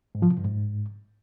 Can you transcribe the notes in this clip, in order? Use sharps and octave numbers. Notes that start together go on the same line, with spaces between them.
G#2
F3
C3
G2
G#2